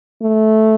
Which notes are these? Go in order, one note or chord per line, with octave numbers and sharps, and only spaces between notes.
A3